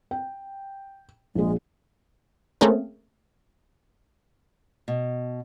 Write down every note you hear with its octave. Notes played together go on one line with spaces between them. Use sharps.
G5
A#1 G#3 G#4
A3 A#3 C4 C#4 G#4 A#4
B2